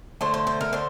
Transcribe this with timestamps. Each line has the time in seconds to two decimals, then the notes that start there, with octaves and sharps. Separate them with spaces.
0.21 D3 A3 C5
0.34 C5
0.47 C5
0.61 A#4
0.73 D3 C5